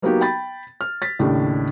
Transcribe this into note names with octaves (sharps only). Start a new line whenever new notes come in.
F#3 A#3 B3 D#4 F#4 G4
G5 B5 A6
F6
A6 B6
D#2 A2 C#3 D4